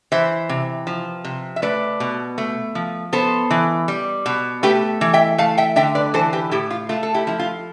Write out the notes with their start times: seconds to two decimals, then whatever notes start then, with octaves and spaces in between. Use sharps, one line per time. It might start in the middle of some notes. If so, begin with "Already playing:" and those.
0.12 E3 C5 E5
0.49 C3
0.87 F3
1.25 C3
1.56 E5
1.62 A3 B4 D5
2.00 B2
2.38 A3
2.75 F3
3.13 B3 A4 C5
3.50 E3
3.88 G3
4.26 B2
4.63 A3 G4 B4
5.01 E3
5.13 E5 G5
5.38 A3 F5 A5
5.57 E5 G5
5.76 D3 E5 G5
5.95 B4 D5
6.14 E3 A4 C5
6.33 G4 B4
6.51 A2 E4 G4
6.70 F4
6.89 A3 F4
7.03 A4
7.14 E4 G4
7.27 F3 E4
7.39 F4